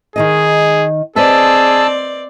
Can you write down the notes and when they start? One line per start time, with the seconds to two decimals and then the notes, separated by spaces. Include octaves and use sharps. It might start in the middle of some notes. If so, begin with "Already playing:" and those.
0.16 D#3 D#4 G#4 D#5
1.16 C4 G#4 B4 C5 D5 D#5 A5 E6